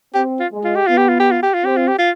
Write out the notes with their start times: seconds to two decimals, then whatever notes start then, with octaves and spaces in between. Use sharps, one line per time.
0.14 C4 G4
0.39 F4
0.52 G#3
0.64 F4
0.75 G4
0.87 B3 F4
0.98 G4
1.09 F4
1.20 G4
1.31 F4
1.42 G4
1.54 F4
1.64 C4 G4
1.77 F4
1.88 G4
1.98 F4